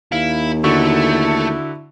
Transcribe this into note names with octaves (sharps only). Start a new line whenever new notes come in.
D#2 E4 F5
D3 A3 E4 F#4 C#6